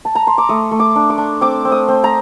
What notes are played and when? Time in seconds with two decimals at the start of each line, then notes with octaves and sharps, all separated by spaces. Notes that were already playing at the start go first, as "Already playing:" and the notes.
0.05 A5
0.15 A#5
0.27 C6
0.38 D6
0.49 A3 D#6
0.71 A3
0.80 D6
0.96 D4
1.10 D6
1.18 D4
1.41 C4 D6
1.65 C4
1.72 D#6
1.88 C4
2.04 A#5